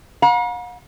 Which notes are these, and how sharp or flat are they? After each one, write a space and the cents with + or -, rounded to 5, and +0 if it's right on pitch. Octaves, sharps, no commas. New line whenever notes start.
F#5 -45 A#5 +45